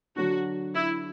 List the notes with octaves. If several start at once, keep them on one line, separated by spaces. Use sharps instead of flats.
D3 F#3 D4 F#4
E4